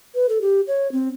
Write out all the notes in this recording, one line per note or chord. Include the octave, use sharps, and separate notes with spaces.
B4
A4
G4
C#5
C4